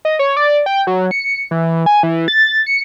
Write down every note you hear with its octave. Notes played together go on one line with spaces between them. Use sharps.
D#5
C#5
D5
G5
F#3
C#7
E3
G#5
E3
A6
C#7